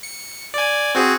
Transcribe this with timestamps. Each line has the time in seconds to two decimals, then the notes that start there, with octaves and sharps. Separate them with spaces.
0.03 C#7
0.54 D5 G#5
0.95 C4 F#4 G#4